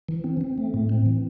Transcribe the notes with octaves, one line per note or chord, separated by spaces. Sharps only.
E3
C4
C4
A3
A2
C4
E3